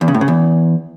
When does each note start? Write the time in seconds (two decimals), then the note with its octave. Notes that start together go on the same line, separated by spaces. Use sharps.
0.01 E2
0.08 C#3
0.14 A2
0.21 C#3
0.28 E2